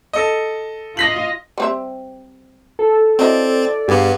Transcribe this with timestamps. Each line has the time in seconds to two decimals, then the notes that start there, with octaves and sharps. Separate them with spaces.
0.13 A4 D#5
0.97 F4 D#5 A#6 B6 F#7
1.58 G3 C4 E5
2.79 A4
3.19 F#3 C4 E4 D5 D#5
3.88 G2 B3 G4 G#4 F5